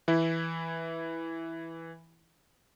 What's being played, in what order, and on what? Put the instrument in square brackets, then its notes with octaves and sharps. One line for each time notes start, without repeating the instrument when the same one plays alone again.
[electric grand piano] E3 E4